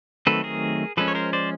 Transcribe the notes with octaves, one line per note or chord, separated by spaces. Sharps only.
D#3 F#3 A3 C4 A4 B4
G#4 A#4
F3 G#3 C#4 A4 B4
C#5
A#4 C5
C5 D5